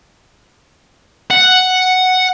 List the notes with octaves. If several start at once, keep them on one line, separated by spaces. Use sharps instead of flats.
F#5